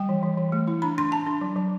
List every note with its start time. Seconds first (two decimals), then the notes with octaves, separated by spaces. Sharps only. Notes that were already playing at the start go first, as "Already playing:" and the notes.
Already playing: G3 G5
0.09 E3
0.23 E3
0.38 E3
0.52 A3
0.68 E4
0.82 D4 B5
0.98 D4 C6
1.12 D4 A5
1.26 D4
1.41 F#3
1.56 F#3